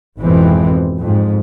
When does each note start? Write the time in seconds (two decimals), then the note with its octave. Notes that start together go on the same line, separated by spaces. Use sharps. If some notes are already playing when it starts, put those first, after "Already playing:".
0.20 G#1 F2 B2 E3 G#3 C4
0.99 F2 G#2